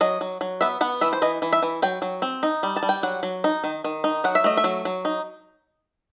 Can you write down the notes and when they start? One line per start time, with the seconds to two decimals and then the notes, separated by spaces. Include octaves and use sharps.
0.01 F#3 D#5
0.21 F#3
0.41 F#3
0.61 B3 E5
0.81 B3 F#5
1.01 E3 E5
1.13 C5
1.22 E3 D#5
1.42 E3
1.53 E5
1.62 E3
1.82 F#3 G5
2.02 F#3
2.22 C4
2.43 D#4
2.63 G3
2.76 A5
2.83 G3
2.89 G5
3.03 F#3 F#5
3.23 F#3
3.44 D#4
3.64 D#3
3.84 D#3
4.04 D#4
4.24 F#3 F#5
4.35 E5
4.44 A3 D#5
4.57 E5
4.64 F#3
4.85 F#3
5.05 D#4